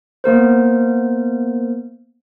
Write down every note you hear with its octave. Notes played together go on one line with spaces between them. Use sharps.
A#3 B3 A#4 C5